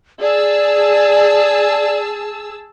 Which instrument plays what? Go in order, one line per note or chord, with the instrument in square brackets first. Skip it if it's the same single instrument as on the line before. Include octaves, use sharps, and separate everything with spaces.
[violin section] G#4 A5 E6 [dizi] D5